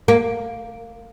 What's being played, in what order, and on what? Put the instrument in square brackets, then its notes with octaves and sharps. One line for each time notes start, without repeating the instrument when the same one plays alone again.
[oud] A#3